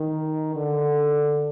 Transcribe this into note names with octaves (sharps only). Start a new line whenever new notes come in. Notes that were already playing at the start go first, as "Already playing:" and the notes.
Already playing: D#3
D3